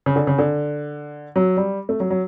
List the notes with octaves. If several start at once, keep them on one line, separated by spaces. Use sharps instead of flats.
C#3
D3
C#3
D3
F#3
G3
A3
F#3
F#3